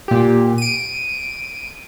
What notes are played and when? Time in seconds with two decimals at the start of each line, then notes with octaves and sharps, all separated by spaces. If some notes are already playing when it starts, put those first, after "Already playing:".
0.08 A#2 G4
0.58 D7 D#7